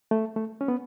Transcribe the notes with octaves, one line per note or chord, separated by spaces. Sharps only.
A3
A3
C#4
B3